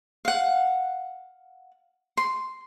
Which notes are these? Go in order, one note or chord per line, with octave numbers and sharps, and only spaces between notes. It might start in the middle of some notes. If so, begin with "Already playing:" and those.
F5 F#5
C6